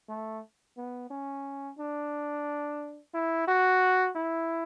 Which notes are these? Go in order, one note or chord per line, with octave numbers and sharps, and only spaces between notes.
A3
B3
C#4
D4
E4
F#4
E4